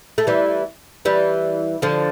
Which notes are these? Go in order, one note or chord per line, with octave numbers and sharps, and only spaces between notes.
A3
E3 G3
E3 G3
D3 F3